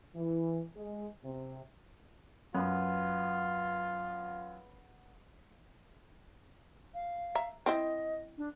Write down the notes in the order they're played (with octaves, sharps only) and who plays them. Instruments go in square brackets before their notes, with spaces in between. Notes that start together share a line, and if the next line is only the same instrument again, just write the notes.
[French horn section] E3
G#3
C3
[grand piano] F#2 [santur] B3 [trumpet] F4
[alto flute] F5
[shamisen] E5 A#5
[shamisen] C4 E4 C5 [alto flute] D#5
[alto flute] D4